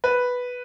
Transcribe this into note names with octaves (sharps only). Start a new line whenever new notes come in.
B4